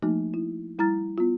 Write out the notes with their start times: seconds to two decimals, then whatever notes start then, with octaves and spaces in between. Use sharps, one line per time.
0.02 F3 A3 A#3 D#4 F#4
0.34 E4
0.79 G3 E4 A#5 F6 A6
1.18 B3 F4